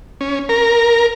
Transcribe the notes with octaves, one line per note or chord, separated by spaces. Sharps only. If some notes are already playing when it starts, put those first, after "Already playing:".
C#4
A#4